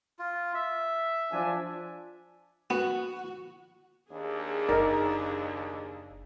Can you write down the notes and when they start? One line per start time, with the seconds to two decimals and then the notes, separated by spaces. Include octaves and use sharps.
0.19 F4
0.54 E5
1.32 F3 D4 G#5
2.70 B3 F#4
4.11 D#2 D4 G#4
4.69 F#1 D#4 A#4 D5